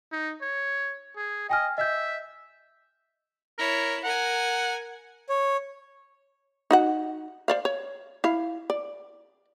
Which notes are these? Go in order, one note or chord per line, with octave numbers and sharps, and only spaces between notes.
D#4
C#5
G#4
D#5 G5 G#5 F6
D#5 E5 G6
E4 A#4 C#5
A#4 F#5 G#5
C#5
D#4 F#4 F#5
C5 D5 F5
C#5
E4 F5
D5